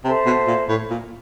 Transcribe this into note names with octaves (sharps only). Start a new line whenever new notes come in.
C3 A4 C5 E5 A5
B2
A#2
A2
A#2